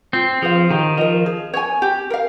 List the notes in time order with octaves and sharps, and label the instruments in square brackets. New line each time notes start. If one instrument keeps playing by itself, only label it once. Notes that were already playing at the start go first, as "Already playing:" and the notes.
[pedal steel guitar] C4 [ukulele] F4
[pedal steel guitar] F3 [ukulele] G#4 C5 F5
[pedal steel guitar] D#3 [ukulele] G4
[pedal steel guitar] F3 [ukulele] A#4 D#5
[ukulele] G#4
C#5 G#5
G4
A#4 F5